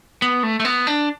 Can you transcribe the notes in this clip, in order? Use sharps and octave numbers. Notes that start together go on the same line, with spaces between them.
B3
A3
A3
B3
D4